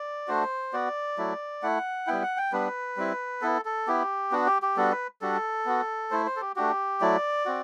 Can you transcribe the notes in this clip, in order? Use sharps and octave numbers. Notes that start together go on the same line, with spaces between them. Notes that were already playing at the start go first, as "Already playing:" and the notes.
Already playing: D5
A3 D4 F#4 C5
B3 F#4 D5
F#3 A3 E4
A3 E4 F#5
G3 B3 E4 G5
F#5
G5
G3 B3 D4 B4
G3 C4 E4
B3 E4 A4
A4
B3 E4 G4
B3 D4 F#4
G4
G4
G3 B3 D4 F#4 A4
B4
G3 D4 F#4 A4
B3 F#4
A3 E4 C5
C5
A4
G4
A3 D4 F#4 G4
F#3 A3 E4 D5
C4 F#4